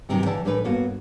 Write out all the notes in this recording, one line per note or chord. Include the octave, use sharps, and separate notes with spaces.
G2 C3 D#3 E3 F#3
D3 E3 D5 A5
A2 E3 A3 D4 A#4 B4
G2 A#3 B3 F#4